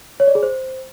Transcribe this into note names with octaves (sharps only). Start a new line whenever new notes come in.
C#5
D5
G#4
C5